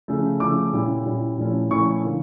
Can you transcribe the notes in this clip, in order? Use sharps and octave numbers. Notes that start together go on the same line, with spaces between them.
C#3 F3 A3
C#3 F3 A3 D6
A#2 G3 C#4 E4
A#2 G3 C#4 E4
A#2 F3 A3 C#4 E4
A#2 F3 A3 C#4 E4 C#6
D3 F3 A#3